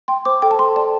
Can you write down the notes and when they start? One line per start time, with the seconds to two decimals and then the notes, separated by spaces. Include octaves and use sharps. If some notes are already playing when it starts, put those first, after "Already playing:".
0.08 G5 C6
0.25 C5 D6
0.42 A4 G5
0.51 A5
0.59 A4 C6
0.76 D5 A5